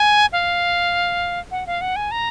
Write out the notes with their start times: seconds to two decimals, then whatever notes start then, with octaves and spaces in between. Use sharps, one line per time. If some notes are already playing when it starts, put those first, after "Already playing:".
Already playing: G#5
0.33 F5
1.51 F#5
1.67 F5
1.81 F#5
1.96 G#5
2.11 A#5